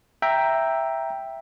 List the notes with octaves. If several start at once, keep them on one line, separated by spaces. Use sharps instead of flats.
E5 G5 A#5